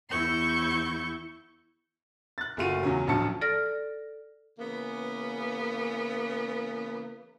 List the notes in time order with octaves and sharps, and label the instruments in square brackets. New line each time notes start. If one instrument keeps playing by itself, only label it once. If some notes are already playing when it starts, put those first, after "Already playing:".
[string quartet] E2 E4 C#6 G6
[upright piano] F#6 A6
F#1 A3 F4 F#4 D#7
E2 C#3 F#3
A1 D2 F3 F#3 A5 C#7
[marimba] A4 D5 F6 A#6
[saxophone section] C#3 E3 A#3 B3